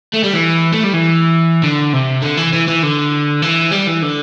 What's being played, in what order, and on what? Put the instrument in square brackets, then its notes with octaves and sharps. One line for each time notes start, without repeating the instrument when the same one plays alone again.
[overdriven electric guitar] A3
G3
E3
A3
G3
E3
D3
C3
D3
E3
E3
E3
D3
E3
G3
E3
D3